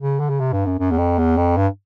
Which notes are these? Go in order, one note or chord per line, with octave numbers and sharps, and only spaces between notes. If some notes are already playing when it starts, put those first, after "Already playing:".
C#3
D3
C#3
C3
G2
F#2
F#2
E2
F2
E2
F2
G2